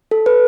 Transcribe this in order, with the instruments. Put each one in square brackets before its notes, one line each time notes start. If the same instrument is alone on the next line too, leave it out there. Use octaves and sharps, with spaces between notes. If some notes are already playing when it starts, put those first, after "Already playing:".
[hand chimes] A4
B4